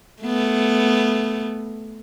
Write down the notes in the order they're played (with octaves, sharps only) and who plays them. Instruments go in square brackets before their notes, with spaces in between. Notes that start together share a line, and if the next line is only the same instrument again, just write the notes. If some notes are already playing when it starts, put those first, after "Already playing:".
[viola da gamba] A3 B3